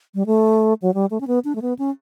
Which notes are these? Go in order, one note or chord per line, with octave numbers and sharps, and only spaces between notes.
G3
A3
F#3
G3
A3
C#4
B3
D4
A3
B3
C#4